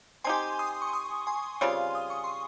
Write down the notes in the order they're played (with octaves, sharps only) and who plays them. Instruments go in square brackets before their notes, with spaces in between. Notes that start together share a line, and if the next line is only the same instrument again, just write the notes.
[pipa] C4 D#4 G4 [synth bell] G#5 C6
[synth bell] C6 D#6
C#6
C6 D#6
G#5 C6
[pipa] C#3 G3 C4 F4 [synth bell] G#5 C6
[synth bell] D#6
C#6
C6